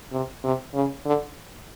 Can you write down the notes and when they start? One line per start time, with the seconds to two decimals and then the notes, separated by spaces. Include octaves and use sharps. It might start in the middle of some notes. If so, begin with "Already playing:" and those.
0.12 C3
0.44 C3
0.74 C#3
1.05 D3